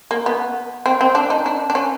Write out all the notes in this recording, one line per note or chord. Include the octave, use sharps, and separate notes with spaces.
A#3
B3
C4
C4
D4
D#4
D4
D4
C#4